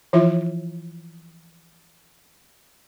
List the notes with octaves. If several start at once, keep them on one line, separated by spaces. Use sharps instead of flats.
E3 F3 E4 F4 E5